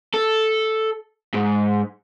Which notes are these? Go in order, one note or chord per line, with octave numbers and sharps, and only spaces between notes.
A4
G#2